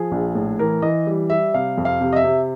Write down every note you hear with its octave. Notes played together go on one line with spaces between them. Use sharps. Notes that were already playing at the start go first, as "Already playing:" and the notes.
Already playing: F3 G#4
A#1
A2
E3 A#4
E3 D#5
G3
G3 E5
C3 F5
F2
F5
C3
D#5
E5
C3